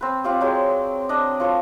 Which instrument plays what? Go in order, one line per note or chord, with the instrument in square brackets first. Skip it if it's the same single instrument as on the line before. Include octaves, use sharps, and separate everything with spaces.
[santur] C4 B4
C4 F4 G4 D5
F#3 G#3 G5
D4 D#5
F3 A4 C#5